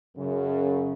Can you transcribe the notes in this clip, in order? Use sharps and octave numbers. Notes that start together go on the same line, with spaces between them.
F#2 C#3